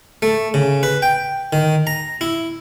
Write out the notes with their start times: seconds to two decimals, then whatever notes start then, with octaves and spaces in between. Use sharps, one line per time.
0.22 A3
0.54 C#3
0.83 B4
1.02 G5
1.53 D#3
1.87 A#5
2.21 E4